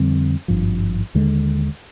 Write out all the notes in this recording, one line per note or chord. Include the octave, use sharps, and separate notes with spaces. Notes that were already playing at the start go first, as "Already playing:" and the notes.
Already playing: F2 D3 G3 C4
G#1 G2 F3
D#2 D3 G#3